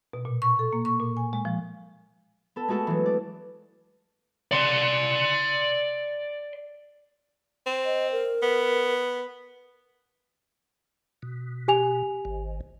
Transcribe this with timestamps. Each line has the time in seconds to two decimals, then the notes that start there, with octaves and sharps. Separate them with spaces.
0.13 B2
0.25 A#2
0.42 C#6
0.59 A4
0.73 A#3
0.85 C#6
1.00 A#2
1.17 G#5
1.33 G#3
1.45 F3
2.56 B3 A4
2.68 G#3 A3 F#4 A4 F#5
2.87 E3 F#3
3.06 D5
4.51 D5 C6
7.66 C4
7.85 D#5
8.12 A#4
8.42 B3
11.22 B2
11.68 G4 G#5 F7
12.25 G#1